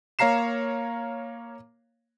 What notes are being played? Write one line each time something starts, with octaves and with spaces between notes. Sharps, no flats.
A#3 C#5 F5 A#5 C7 E7